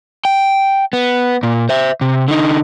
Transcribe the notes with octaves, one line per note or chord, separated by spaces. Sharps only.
G5
B3
A#2
C5 E5
C3
D3 D#4